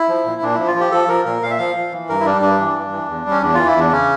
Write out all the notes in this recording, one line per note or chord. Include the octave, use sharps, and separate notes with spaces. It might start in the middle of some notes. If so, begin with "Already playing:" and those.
Already playing: E4
F3
A#2
A#2 D4
F3 E4
F4
F3
G4
F3 A4
F3 A#4
A#2 A#4
A#2 F5
E5
F3 F5
F3
E3
G2 A#4
E4
G3 D4
G2 D4
E3
G2
E3
E2
G3 C#4
E2 D4
E3 F4
E4
E2 D4
C#3 C#4